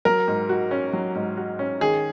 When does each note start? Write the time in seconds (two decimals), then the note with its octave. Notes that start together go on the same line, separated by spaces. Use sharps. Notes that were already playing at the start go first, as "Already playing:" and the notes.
0.05 F#3 A#4
0.28 G#2
0.49 F#4
0.71 C#4
0.93 F#3
1.15 G#2
1.37 F#4
1.59 C#4
1.81 D#3 G#4